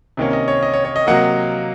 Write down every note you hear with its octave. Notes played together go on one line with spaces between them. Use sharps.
C3 D#3 A#3 C#4
D#5
C#5
D#5
C#5
C#5
D#5
C3 F#3 A#3 D#5 F#5